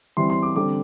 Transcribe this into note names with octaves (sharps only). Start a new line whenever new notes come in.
E3 G3 C4 C6
C6
D6
D3 G3 C4 D6